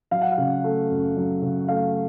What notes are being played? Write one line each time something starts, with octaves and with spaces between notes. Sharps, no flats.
F#3 F5
F#5
F5
C#3
A3
F#2
F#3
C#3
A3 F5